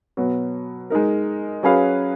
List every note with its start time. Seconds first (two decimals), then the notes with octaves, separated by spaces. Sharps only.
0.17 B2 F#3 B3
0.90 G#3 D#4 A#4
1.63 F#3 C#4 G#4 B4 F5